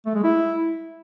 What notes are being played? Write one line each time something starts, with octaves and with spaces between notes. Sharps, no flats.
A3
G#3
E4